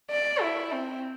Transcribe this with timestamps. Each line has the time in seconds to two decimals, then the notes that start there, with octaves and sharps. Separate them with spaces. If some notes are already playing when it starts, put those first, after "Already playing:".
0.11 D5
0.42 E4
0.72 C4